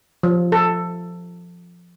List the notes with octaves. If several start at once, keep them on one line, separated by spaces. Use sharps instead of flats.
F3
A4